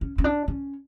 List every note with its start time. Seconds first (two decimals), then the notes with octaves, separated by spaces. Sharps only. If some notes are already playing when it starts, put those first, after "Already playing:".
0.01 C#4
0.18 C#4
0.24 D4
0.48 C#4